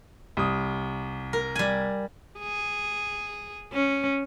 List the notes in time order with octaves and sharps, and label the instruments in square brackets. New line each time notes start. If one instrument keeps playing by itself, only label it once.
[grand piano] C2 D#6
[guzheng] A#4
G3 G#5
[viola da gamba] G#4
C#4